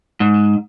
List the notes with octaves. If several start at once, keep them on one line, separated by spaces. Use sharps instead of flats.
G#2